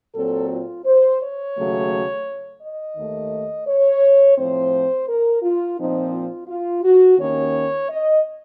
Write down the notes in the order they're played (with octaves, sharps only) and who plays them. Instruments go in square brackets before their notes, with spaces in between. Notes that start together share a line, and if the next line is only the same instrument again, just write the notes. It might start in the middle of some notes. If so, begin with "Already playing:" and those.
[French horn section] A#2 F#3 C4 A4
F4
C5
C#5
D#2 C#3 F#3 A3
D#5
D#2 D#3 A3
C#5
A2 F3 C4 C5
A#4
F4
A#2 F3 C4 D#4
F4
F4
F#4
D#2 D#3 A#3 C#4 C#5
D#5